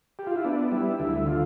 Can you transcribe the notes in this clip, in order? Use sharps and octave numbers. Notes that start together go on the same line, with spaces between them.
G4
F4
E4
B3 D4
G3 E4
D2 E4
D3 F4